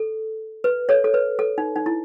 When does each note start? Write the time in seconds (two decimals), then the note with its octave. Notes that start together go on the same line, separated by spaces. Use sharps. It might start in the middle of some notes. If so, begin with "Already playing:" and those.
Already playing: A4
0.64 B4
0.89 A4 C#5
1.04 A4
1.14 B4
1.39 A4
1.58 D#4
1.76 D#4
1.86 E4